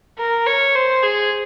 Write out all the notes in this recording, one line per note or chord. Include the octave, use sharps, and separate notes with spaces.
A#4
C#5
C5
G#4